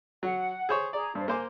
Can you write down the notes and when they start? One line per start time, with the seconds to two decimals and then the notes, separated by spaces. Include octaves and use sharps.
0.23 F#3 F#5
0.69 G#4 C5 C#5
0.93 G#4 D5 A#5
1.15 G2 D4 C5
1.28 A#3 C5 G#5 C6 D6